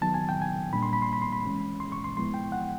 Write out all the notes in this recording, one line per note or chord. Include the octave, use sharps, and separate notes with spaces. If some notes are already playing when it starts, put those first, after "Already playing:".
D#3 F#3 B3 D#4 A5
G#5
G5
G#5
A#2 G3 A#3 D4 B5
C6
B5
C6
B5
C6
B5
E3 G#3 C#4
C6
C#6
C6
A2 F3 G#3 B3 E4 C6
G5
F#5